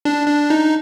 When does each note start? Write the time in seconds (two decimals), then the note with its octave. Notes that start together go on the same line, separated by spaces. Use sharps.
0.05 D4
0.27 D4
0.50 D#4